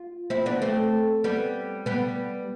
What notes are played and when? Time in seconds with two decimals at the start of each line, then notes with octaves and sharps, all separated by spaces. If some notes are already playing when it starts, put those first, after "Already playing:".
Already playing: F4
0.30 C4 E4
0.46 B3 D4
0.62 A3 C4
1.24 G3 B3
1.86 G3 B3